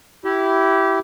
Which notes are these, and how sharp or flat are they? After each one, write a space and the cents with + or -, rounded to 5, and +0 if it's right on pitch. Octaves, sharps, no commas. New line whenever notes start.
E4 +0 G4 -20